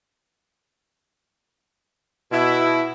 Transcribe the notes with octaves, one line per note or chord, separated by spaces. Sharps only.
B2 E4